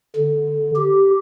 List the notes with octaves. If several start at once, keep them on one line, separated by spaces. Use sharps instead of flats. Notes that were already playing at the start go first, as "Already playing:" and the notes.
D3
G4